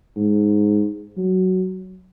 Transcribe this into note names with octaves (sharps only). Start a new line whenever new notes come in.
G#2
F#3